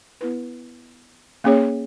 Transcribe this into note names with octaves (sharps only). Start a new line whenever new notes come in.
B3 E4 B4
A#3 C#4 G#4 C#5